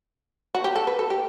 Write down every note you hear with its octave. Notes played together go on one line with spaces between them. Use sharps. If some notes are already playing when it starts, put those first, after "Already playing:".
F#4
G4
A4
B4
A4
G4